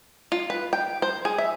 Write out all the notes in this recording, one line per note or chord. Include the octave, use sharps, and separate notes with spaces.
F4
B4
G5
C5
G#4
E5